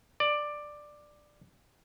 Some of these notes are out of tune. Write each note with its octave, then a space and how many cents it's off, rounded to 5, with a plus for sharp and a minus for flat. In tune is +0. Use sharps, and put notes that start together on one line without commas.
D5 +10